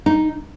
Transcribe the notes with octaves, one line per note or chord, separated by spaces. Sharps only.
D#4